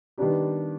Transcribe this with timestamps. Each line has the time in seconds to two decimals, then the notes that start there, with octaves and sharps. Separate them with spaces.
0.18 D#3 G3 B3 D4 G4